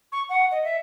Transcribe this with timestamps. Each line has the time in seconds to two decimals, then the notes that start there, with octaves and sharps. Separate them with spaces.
0.12 C#6
0.29 F#5
0.51 D#5
0.64 E5